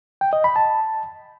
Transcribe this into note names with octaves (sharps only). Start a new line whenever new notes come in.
G5
D#5
B5
A5